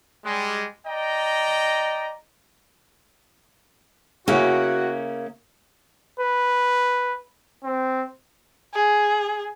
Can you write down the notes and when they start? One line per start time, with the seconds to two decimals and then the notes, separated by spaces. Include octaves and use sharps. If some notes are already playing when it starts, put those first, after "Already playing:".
0.25 G3 G#3
0.86 D5 D#5 G5 A#5
4.28 C#3 A#3 C#4 E4 F#4
6.20 B4
7.64 C4
8.74 G#4